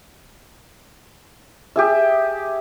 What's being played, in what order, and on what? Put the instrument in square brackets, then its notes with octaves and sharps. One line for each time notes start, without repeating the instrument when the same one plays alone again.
[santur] G4 G#4 E5